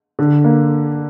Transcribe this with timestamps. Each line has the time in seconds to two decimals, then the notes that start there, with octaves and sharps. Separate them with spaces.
0.19 D3
0.44 A#3